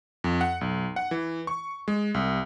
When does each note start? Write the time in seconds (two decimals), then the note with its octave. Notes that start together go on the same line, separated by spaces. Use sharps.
0.24 F2
0.41 F#5
0.61 B1
0.96 F#5
1.11 E3
1.47 C#6
1.88 G#3
2.14 C2